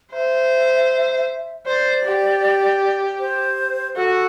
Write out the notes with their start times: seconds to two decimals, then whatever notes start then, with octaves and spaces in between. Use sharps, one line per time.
0.13 C5 E5
1.66 C5 D5
2.04 G4
3.20 C5
3.96 F#4 A4